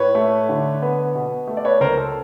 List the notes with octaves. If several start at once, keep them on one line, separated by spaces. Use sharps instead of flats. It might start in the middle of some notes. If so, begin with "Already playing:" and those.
Already playing: A2 B4 C#5
A3
D3
B3
B2
A3
D5
B4 C#5
C#2 A#4 C5
A4